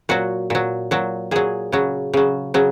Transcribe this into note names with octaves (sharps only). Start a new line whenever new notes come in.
A#2 F#3 F#4
A#2 F#3
A#2 F#3
A#2 F#3 G#4
C#3 F#3
C#3 F#3
C#3 F#3